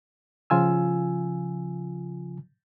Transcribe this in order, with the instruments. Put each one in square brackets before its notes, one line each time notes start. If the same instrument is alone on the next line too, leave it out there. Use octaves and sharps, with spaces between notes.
[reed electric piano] C#3 F3 F4 G#5 E6